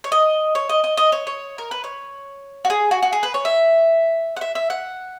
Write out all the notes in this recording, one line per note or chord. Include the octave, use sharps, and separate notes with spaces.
C#5
D#5
C#5
D#5
D#5
D#5
C#5
C#5
A#4
B4
C#5
F#4
G#4
F#4
F#4
G#4
B4
C#5
E5
F#5
E5
E5
F#5